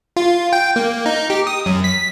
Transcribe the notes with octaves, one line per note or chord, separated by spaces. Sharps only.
F4
G5
A#3
D#4
G4
D#6
F#2
B6